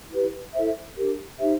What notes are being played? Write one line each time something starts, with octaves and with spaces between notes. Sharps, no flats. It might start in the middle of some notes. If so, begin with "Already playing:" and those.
E4 G4 B4
E4 A4 C5 E5
D4 G4 A#4
D#4 G4 C5 E5